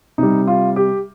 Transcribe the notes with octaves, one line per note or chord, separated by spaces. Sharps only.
C3 G3 D#4
F4
G4